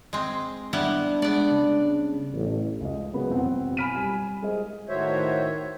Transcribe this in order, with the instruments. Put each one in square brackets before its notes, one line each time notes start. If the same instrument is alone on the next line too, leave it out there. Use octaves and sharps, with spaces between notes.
[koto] G#3 C4
[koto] G3 B3 E4 [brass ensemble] D4
[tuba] G#3 [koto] B3 D5
[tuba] C#3
A1
[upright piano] C#2 D#5
C#3 F#3 B3 F#4 B4
E1 F#2 C4 F#5
G#5 B5 F6 B6 D7 D#7
G3 G#5
G#3 G#4 C5 D#5
[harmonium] A2 D#3 F#4 C5 C#5 E5